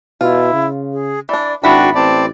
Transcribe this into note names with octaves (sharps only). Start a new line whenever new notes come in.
B2 E4 F4
C#3
G#4
E3 D4 D5
G#1 B3 D4 E4 F#4 G5 B5
A1 C4 D5 A5